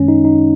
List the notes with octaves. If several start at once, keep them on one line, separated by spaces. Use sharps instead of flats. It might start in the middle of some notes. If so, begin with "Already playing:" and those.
Already playing: F#2 D#3 G#3 C#4
D#4
D#4